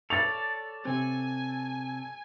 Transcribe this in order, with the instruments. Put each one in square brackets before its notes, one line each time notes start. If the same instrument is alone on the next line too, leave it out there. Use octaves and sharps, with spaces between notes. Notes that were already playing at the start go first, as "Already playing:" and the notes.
[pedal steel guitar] A4 C#5 D5 [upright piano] A6 F7
[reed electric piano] C3 C4 [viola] G#5